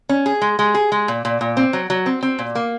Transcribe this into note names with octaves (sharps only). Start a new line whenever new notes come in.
C#4
G#4
G#3
G#3
G#4
G#3
A#2
A#2
A#2
C4
F#3
F#3
C4
C4
A#2
A#3